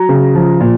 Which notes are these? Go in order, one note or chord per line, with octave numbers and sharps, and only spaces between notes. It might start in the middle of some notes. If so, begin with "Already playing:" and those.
Already playing: F#3 A#5
C#3
F3
A#2